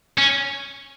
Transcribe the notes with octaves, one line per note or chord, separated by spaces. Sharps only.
C#4